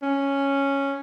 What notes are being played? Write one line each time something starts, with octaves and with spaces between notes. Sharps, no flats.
C#4